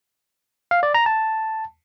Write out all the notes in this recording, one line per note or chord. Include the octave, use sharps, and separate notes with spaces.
F5
D5
A#5
A5